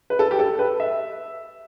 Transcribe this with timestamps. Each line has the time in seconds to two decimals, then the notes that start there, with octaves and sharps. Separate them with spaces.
0.10 B4
0.19 A4
0.31 G4
0.39 A4
0.59 B4
0.80 E5